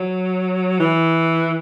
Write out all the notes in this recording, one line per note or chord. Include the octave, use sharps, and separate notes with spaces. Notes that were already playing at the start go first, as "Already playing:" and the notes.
Already playing: F#3
E3